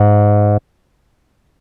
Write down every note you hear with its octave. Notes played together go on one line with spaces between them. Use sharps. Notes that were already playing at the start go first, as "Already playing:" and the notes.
Already playing: G#2